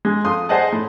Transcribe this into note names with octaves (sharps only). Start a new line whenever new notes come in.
G#3
F2 C6 D#6
G#4 C5 D5 D#5 F#5 A5
A2